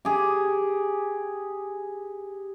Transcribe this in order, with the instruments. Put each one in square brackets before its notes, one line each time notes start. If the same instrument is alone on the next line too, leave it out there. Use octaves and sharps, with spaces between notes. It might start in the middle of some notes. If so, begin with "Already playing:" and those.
[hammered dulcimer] G4 G#4